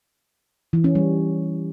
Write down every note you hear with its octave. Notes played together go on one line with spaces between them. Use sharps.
E3
C#4
G3